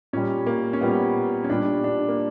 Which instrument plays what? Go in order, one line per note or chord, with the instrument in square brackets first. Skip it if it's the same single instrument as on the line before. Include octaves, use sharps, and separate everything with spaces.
[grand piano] A#2 G3 C#4
A#3
C#4
A#2 G3 B3
C#4
A#2 G3 D4
D4
A#3